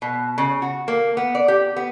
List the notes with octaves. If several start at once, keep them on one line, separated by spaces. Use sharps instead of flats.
B2
C#3
F#4
A#3
B3
D5
G4
B3